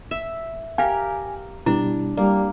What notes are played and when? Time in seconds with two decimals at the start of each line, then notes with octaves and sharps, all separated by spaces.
0.11 E5
0.78 G4 A#4 F5 G5 G#5
1.66 B2 G3 D4 E4
2.17 G3 A#3 G4 D5